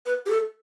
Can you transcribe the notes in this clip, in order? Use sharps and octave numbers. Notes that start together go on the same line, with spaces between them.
B4
G4
A4